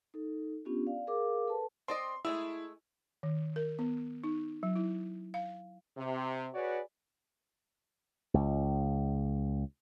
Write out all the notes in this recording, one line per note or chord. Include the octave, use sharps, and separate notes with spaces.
D#4 A4
B3 C#4 D4 F4 G4
D5 F5
G#4 A#4 F5 D6
A4 B4 A5
C4 D5 D#5 C6
G#3 A3 E4 G#4 E6
D#3
A#4
B3
D#4
F#3
E4
F5
C3
F#4 G#4 B4 C#5 D5
C#2